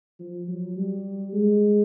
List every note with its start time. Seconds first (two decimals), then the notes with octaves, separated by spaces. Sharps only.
0.20 F3
0.48 F#3
0.77 G3
1.33 G#3